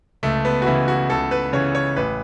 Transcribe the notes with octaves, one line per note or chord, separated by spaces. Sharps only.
C#2 A3
B3
F#4
C#3 E3 E4
F#4
C#2 A4
B4
C#3 E3 C#5
C#5
A1 B4